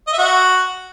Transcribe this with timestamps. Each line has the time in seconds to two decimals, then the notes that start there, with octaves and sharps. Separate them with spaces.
0.07 D#5
0.13 E5
0.18 F#4